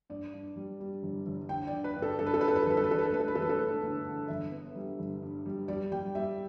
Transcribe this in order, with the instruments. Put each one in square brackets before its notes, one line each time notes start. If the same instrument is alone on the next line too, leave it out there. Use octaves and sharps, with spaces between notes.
[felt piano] G2 D5
G2
G3
G3
G1
G1
D3 G5
D5
D3
B4
G2
A4
G2 A4
B4
A4
G2 B4
A4
B4
A4
G1 B4
A4
B4
E1 A4
B4
A4
A3 B4
A4
B4
E1 A4
B4
A4
A3 B4
D2
D3
G1 E5
B3
G3
G1
G2
G3
G3 D5
G3 G5
G3 E5